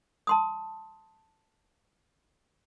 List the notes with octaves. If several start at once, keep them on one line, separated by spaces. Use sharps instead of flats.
A5 C6 D#6